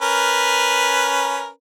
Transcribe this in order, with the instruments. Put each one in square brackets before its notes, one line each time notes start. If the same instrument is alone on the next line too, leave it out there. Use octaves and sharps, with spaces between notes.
[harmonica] C#4 A#4 B4